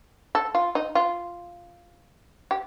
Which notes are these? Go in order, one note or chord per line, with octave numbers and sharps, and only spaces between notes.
A4
F4
D#4
F4
G4